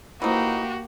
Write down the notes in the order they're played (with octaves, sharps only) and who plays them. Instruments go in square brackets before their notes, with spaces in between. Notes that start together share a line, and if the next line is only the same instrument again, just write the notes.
[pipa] E3 F3 D#4 [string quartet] A#3 G4 [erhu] F#4